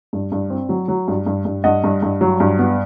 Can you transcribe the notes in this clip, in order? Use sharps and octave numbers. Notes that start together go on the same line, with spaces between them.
G2
G2
C4
F#3
F#3
G2
G2
G2
G2 D#5 F#5
G2
G2
F#3
G2
B3